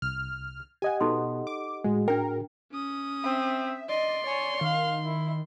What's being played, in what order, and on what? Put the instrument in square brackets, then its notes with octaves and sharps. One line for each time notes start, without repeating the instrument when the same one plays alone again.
[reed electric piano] C2 [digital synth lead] F6
[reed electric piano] G4 D#5 F#5 [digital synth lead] G#5
[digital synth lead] B2 [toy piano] D#4 A4 C6
[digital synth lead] D6
[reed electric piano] A2 F#4 G#4 [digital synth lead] G#3
[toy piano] D4 G5 [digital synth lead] A#4
[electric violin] C#4 D#6
[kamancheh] C4 [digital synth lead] E5
[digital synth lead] D5 [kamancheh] D#5 [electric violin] C6
[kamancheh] C#5 G#5
[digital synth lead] D#3 [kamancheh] F5
[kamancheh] E4